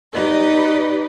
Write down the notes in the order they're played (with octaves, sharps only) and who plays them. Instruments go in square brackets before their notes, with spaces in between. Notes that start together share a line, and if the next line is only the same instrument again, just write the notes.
[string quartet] D#4 G4 B4 D5 D#5